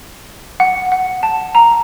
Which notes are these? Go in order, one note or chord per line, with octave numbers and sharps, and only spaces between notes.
F#5
F#5
A5
A#5